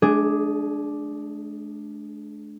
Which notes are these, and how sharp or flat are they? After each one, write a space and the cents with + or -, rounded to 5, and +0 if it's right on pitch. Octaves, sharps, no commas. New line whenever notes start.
A3 -45 D4 +0 G#4 +0